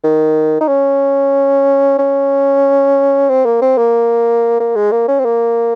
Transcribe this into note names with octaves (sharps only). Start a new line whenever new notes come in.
D#3
D#4
C#4
C#4
C4
A#3
C4
A#3
A#3
G#3
A#3
C#4
C4
A#3